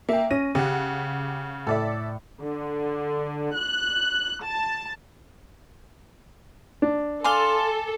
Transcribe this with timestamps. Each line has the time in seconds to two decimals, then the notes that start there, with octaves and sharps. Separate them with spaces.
0.09 A#3 E5 G5
0.31 C#4 A#6 D#7
0.55 C#3 G4 F#5
1.67 A2 A4 D5 E5
2.41 D3
3.55 F#6
4.43 A5
6.82 D4
7.24 A4 F5 G#5 C6 D6 G7